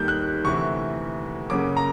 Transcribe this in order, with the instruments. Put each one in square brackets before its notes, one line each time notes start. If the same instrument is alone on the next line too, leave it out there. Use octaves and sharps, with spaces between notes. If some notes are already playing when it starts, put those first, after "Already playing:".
Already playing: [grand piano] D#2 D#3 G3 A#3 G6
F#6
D2 C3 E3 C#6
F#2 C#3 F#3 A#3 D6
A#5